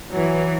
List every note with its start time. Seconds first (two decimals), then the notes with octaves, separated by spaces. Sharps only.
0.11 E3 F#3